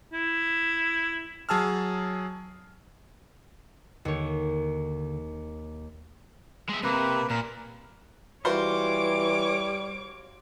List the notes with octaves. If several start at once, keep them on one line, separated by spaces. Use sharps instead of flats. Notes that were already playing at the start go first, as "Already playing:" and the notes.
E4
F#3 G#4 A5 E6 F6
D#2 D3 C#5
G#3 E5
C3 A#3 B4
A#2 A#4
E3 G3 F4 F#4 C5 C#5 D6